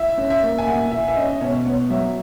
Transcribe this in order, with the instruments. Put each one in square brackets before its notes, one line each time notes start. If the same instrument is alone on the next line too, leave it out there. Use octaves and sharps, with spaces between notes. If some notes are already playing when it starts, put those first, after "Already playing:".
Already playing: [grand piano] E4 [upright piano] E5
[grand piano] C#4
[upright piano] E5
[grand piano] A#3
[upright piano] G#5
[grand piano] A#2 [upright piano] F#5
[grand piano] E4 [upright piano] E5
[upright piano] E5
[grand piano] C#4 [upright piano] D#5
[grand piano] B2 [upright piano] C#5
[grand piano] B3 [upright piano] C#5
[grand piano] F#3 [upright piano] E5